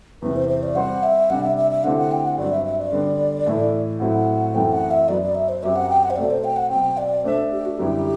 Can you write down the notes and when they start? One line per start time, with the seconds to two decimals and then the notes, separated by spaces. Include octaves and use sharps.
0.22 E2 C3 E3 B4
0.36 C5
0.49 C5
0.63 D5
0.75 G3 C4 G4 C5 F#5
1.03 E5
1.30 C3 G3 D4 F#5
1.43 E5
1.57 E5
1.71 E5
1.84 D3 A3 C4 E4 G4 F#5
1.97 F#5
2.11 G5
2.24 F#5
2.37 G2 F#3 C4 D5
2.52 E5
2.65 E5
2.79 D5
2.92 D3 G3 B3
3.46 A2 E3 A3 E4
4.00 A2 F#3 C4 E4 F#5
4.54 F#2 E3 A3 C4 G5
4.72 F#5
4.91 E5
5.08 F#2 F#3 B3 D5
5.22 D5
5.35 E5
5.49 C5
5.62 F#2 F#3 C4 G4 E5
5.76 F#5
5.89 G5
6.03 F#5
6.10 C5
6.16 B2 A3 C4 D5
6.30 C5
6.44 G5
6.56 F#5
6.70 B2 F#3 C4 G5
6.97 D5
7.24 A3 D4 A4 C5 E5
7.52 G4
7.65 F#4
7.78 F#2 D3 G3 B3 E4 G4